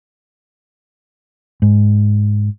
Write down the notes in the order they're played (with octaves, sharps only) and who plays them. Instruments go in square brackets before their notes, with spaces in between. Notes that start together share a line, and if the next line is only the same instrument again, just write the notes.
[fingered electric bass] G#2